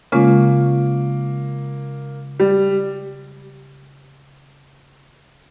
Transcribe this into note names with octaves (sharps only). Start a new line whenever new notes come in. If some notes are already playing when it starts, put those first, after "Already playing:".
C#3 G#3 A#3 C#4 F4
G3